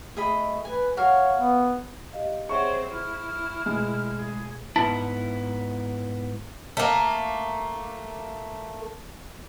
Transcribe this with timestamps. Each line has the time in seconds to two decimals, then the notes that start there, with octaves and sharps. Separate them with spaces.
0.17 A3 G#4 D#5 B5
0.65 B4 G#5
0.97 F#4 A#4 C#5 F5
1.36 B3
2.13 G4 D#5 F5
2.49 C4 G#4 C5 C#5 E5 F#5 C#6
2.92 E4 F6
3.66 B2 G#3 A3
4.18 G#4
4.76 G#2 B3 E4 A5
6.77 A3 A#3